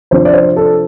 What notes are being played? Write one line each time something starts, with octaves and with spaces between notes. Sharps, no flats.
C3 F3 D4 F4 C5
D5
C5
A4